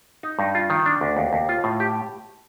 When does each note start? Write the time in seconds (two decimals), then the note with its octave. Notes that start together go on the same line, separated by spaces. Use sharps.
0.23 D#4
0.39 G2
0.55 F4
0.70 D#3
0.86 D4
1.01 D2
1.17 D#2
1.33 D#2
1.49 F4
1.64 A2
1.80 G4